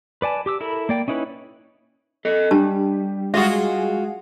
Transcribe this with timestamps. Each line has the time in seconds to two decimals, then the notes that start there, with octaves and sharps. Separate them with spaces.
0.22 B4 D5 G#5 A5
0.46 G4 D6 E6
0.61 E4 A4 A#4 B5
0.89 A#3 D5 G5
1.08 C#4 D#4 E4 B4 C#5
2.25 A4 D#5
2.51 G3 D4 G4 A5
3.34 G#3 F4 F#4 G#4 E5